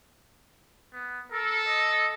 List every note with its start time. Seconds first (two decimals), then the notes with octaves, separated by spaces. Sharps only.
0.93 B3
1.32 A4 A#4
1.68 D#5